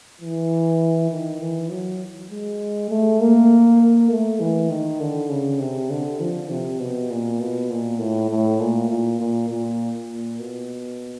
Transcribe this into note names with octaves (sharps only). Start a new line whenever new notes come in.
E3
D#3
E3
F#3
G#3
A3
A#3
A3
E3
D#3
D3
C#3
C3
D3
F3
C3
B2
A#2
B2
A#2
A2
A2
A#2
A#2
A#2
A#2
A#2
B2